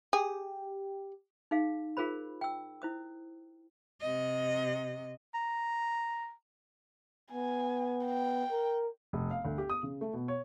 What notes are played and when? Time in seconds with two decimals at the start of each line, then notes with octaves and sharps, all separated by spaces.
0.13 G4 G#4
1.51 D#4 G#4 F5
1.97 F4 G#4 A#4 C5 B5
2.41 G5 E6
2.82 E4 C5 D#6
4.01 C3 D#5
5.34 A#5
7.32 B3 G#5
8.05 G5
8.51 A#4
9.13 F1
9.31 F5
9.45 D2
9.58 G4
9.70 D#6
9.83 C#3
10.01 A3
10.14 B2
10.28 C#5